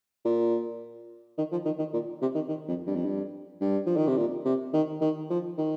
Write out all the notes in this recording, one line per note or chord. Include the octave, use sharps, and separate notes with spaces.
A#2
D#3
F3
D#3
D#3
A#2
C3
D#3
D#3
F2
G2
F2
G2
G2
F3
D#3
C3
A#2
C3
D#3
D#3
F3
D#3